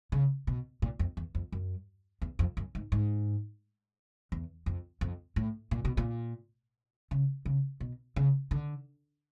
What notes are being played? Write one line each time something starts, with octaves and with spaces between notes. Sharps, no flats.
C#3
B2
A#2
F2
E2
F2
F#2
E2
F2
F#2
G#2
G#2
E2
F2
F2
A2
A#2
B2
A#2
C#3
C#3
B2
C#3
D3